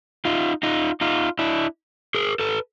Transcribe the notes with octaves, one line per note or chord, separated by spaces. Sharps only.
D#4 F4
D#4 F4
D#4 F4
D4 E4
G#4 A#4
A4 B4